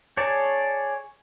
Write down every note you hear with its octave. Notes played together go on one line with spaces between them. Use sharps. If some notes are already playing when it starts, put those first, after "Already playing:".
G#4 C#5 D5 A5